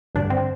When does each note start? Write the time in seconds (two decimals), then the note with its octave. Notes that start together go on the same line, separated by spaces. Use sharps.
0.15 A1 G2 D3 D4
0.30 C4